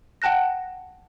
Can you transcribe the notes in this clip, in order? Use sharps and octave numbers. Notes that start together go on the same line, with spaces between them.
F#5 G5 A5 F#6 A#6